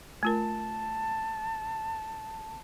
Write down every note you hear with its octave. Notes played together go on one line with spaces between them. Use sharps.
A3 F4 A#4 A5